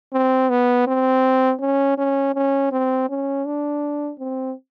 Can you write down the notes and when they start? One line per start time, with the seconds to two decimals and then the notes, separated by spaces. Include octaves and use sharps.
0.13 C4
0.50 B3
0.87 C4
1.60 C#4
1.98 C#4
2.34 C#4
2.71 C4
3.09 C#4
3.45 D4
4.19 C4